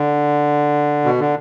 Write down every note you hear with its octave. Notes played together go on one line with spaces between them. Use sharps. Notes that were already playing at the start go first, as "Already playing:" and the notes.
Already playing: D3
B2
D3